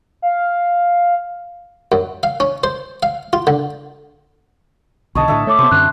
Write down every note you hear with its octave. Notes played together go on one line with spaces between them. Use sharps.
F5
F#2
F5
C#4
C5
F5
F4
D3
B1 D3 C#5 D#5 A5
A2 D3 A4 E5
A3 C#5 D6
C3 B3 C5
F#2 D3 C4 F#6